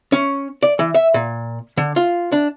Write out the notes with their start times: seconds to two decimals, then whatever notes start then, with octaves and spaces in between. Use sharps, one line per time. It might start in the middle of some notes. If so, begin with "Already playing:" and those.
0.12 C#4
0.63 D5
0.79 E3
0.94 E5
1.14 A#2
1.77 D3
1.96 F4
2.32 D4